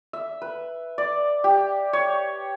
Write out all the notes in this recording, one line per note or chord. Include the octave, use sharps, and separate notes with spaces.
E5
B4
D5
G4
C#5